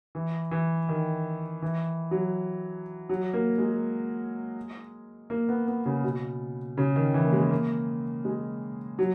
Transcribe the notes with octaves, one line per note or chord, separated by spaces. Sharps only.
E3
E3
D#3
E3
F#3
F#3
A#3
G#3
A#3
B3
B3
C#3
B2
C#3
D#3
E3
A#3
G#3
A#3
G#3
F#3